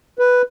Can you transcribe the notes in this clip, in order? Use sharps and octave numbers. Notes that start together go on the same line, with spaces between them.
B4